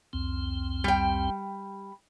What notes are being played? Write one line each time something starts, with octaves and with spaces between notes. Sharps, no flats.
C2 F2 C4
G3 G5